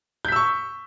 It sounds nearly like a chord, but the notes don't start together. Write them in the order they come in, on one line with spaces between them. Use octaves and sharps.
G6 B6 E6 C#6